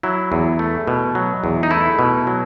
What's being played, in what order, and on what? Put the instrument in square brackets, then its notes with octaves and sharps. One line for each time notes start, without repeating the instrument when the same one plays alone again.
[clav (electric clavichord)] F#3 E4
E2
A3
B2
F#3
E2
D#4
A3 E4
B2
F#3